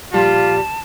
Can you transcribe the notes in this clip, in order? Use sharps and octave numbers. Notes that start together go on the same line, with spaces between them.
A#2 F3 G3 F4 G4 A5